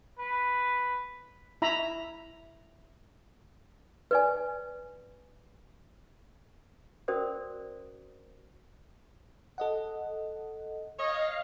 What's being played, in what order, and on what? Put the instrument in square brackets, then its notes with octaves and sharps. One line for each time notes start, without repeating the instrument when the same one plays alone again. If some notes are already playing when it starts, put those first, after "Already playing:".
[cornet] B4
[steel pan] E4 E5 A#5 B5
[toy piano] B4 D5 G#5
C#4 F#4 A#4 C5 D5 D#6
[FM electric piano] A4 D#5 F#5
[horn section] C#5 D#5 [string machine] F5